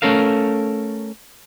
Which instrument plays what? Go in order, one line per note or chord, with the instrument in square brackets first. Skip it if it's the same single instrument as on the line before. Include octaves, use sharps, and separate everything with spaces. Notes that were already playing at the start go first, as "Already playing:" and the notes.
[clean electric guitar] A3 C#4 A4 A#4 F5